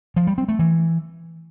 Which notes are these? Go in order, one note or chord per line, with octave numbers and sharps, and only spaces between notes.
F3
G3
C4
A3
E3